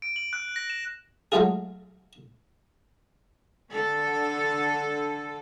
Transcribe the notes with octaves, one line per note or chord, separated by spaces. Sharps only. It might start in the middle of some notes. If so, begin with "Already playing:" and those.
D7
F#7
F#6
A#6
E7
F#3 G#3 A3 F4 G#4
D3 A4